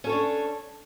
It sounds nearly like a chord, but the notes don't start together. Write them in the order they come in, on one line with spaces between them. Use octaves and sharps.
C#4 A4 C#5 D4